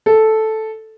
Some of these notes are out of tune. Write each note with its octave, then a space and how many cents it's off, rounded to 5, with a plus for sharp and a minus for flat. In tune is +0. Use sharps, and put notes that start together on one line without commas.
A4 -5